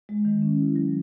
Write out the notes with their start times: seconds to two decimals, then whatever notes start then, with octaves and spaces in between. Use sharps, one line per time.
0.09 G#3
0.25 D#3
0.42 C#4
0.60 E4
0.76 F#3